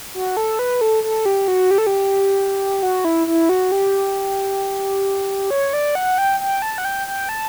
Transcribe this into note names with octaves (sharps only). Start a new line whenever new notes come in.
F#4
A4
B4
A4
A4
G4
F#4
G4
A4
G4
F#4
E4
E4
F#4
G4
C#5
D5
F#5
G5
G5
A5
F#5
G5
G5
A5